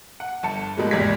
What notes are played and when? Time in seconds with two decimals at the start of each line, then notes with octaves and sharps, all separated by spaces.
0.20 F#5
0.43 G1 A5 C#7
0.77 G#2 B2 G3 G#3 A#3
0.91 G#1 E2 C3 D5 G#6 B6